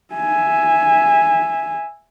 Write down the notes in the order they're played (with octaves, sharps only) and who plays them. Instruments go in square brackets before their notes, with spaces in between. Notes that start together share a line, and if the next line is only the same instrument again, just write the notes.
[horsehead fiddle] E5 G#5